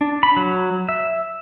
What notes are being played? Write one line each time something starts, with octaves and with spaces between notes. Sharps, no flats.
D4
B5
F#3
E5